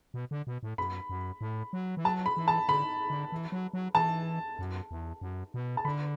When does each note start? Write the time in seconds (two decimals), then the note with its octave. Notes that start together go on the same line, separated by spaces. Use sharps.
0.14 B2
0.31 D3
0.47 B2
0.63 A2
0.78 F#2 B5
1.10 F#2
1.41 A2
1.73 F#3
1.97 E3
2.05 F#3 A5
2.26 B5
2.37 E3
2.48 A5
2.68 D3 B5
3.10 D3
3.32 E3
3.52 F#3
3.73 F#3
3.95 E3 A5
4.59 F#2
4.91 E2
5.21 F#2
5.54 B2
5.77 A5
5.85 D3 B5